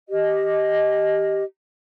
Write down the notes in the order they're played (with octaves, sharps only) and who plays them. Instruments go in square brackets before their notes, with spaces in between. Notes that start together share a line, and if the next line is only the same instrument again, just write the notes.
[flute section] G4 D#5